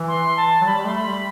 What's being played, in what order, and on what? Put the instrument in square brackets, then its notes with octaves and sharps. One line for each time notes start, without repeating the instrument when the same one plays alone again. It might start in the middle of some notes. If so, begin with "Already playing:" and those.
Already playing: [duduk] E3
[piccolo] C6
A5
[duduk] F#3
[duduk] G3 [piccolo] B5
[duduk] G3
[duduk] A3 [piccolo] C6
[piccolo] B5
[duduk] G3